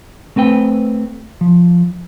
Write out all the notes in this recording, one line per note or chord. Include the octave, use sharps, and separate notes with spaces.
A3 C4 B4 G5
F3